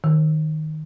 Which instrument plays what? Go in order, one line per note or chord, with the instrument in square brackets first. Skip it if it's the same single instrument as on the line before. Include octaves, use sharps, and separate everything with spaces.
[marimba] D#3